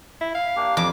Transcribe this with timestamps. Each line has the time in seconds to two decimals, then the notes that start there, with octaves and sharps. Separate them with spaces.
0.21 E4
0.35 F5
0.56 A#3 D4 G4
0.77 F2 D6